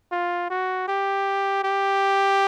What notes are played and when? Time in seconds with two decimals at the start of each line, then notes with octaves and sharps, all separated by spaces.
0.12 F4
0.50 F#4
0.88 G4
1.64 G4